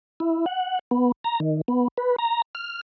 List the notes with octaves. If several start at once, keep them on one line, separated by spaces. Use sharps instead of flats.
E4
F#5
B3
A#5
D#3
B3
B4
A#5
F6